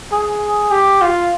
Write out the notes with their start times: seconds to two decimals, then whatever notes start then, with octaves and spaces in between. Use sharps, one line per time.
0.12 G#4
0.71 G4
1.02 F4